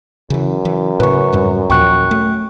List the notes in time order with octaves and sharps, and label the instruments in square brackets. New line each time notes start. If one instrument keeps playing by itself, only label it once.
[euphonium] F#2 [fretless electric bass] C#3 E3
[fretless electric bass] E3
[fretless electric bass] A2 C#3 [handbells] B4 C#6
[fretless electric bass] F2 G#2 G3
[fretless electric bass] D#2 A#2 F3 [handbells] G5 C#6 F#6
[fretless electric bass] A3